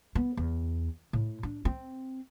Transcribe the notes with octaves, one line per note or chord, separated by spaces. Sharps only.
B3
E2
A2
D4
C4